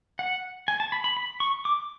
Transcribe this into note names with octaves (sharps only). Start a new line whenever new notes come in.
F#5
G#5
A5
B5
B5
B5
C#6
D6